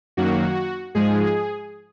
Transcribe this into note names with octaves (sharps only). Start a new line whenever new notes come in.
F#2 D#3 F#3 A#3 F#4
G#2 F3 G#3 G#4